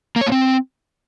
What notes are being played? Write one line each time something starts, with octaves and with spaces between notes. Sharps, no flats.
A#3
C#5
A#3
C4